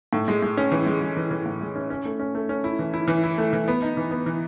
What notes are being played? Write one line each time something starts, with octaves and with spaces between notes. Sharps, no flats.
A2
G#3
G#3
C#4
E3
G#3
G#3
E3
E3
A2
G#3
C#4
C#4
A3
C#4
A3
C#4
E4
E3
E4
E3
E4
A3
E3
B3
D#4
E3
B3
E3